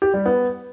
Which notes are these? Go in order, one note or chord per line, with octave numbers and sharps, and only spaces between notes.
G4
G3
B3